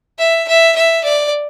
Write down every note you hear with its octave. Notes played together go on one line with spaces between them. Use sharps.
E5
E5
E5
D5